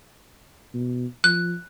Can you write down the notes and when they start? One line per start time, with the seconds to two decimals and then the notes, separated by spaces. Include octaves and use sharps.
0.74 B2
1.24 F3 F#6